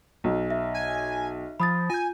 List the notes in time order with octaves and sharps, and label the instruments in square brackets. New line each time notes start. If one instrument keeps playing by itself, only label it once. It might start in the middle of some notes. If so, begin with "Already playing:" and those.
[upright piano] B1
[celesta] E5
[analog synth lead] G#5
[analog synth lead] F3 [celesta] B5 D#6 A6
[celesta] F4 G6 [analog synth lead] G#5